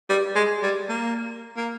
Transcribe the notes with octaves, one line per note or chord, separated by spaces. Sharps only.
G3
G#3
G3
A#3
A#3